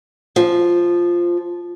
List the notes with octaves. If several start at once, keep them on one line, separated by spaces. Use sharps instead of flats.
F3